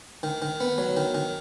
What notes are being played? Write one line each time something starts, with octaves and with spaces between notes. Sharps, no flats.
D#3
D#3
B3
F#3
D#3
D#3